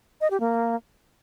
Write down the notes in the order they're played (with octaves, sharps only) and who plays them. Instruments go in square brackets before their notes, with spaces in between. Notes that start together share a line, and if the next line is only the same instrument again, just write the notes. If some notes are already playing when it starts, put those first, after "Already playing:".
[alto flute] D#5
G4
A#3